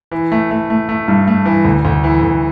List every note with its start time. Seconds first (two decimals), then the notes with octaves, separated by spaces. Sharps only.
0.11 E3
0.32 A3
0.51 A3
0.70 A3
0.89 A3
1.08 G2
1.28 A3
1.45 E3
1.65 D2
1.85 D2
2.04 E3
2.22 D2